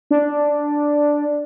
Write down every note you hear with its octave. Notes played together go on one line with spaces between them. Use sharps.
D4